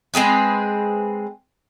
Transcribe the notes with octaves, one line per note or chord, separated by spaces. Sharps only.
G#3 C4 G#4 B4